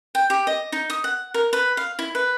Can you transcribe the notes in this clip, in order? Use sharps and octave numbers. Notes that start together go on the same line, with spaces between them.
G5
G4
D#5
D#4
D#6
F#5
A#4
B4
F5
E4
B4